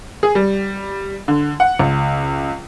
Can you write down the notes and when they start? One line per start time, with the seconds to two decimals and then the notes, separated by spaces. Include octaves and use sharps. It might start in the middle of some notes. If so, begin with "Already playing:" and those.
0.23 G#4
0.35 G3
1.28 D3
1.60 F#5
1.79 C#2